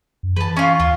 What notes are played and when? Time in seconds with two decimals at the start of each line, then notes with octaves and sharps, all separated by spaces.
0.23 F#2
0.36 E3 B4 A5
0.57 C#4 F4
0.80 D#2 F4